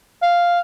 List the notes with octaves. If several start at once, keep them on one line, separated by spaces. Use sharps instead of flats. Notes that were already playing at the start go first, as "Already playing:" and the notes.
F5